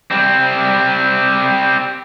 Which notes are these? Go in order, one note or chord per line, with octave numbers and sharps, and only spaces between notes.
G3 C4